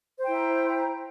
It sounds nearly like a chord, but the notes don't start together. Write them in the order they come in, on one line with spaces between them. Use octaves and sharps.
C5 G5 E4 A#5